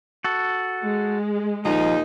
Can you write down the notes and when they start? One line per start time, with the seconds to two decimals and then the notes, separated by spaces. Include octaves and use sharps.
0.24 F#4 A4
0.84 G#3
1.65 D#2 A#2 F3 D#4